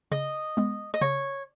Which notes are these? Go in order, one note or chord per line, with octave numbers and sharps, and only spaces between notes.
C#3 D#5
G#3 B3
D#5
C#3 C#5